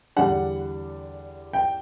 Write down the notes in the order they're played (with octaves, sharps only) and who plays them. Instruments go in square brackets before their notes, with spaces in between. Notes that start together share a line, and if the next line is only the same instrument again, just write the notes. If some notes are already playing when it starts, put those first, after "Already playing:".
[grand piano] E2 D3 G3 D4 F#5
G5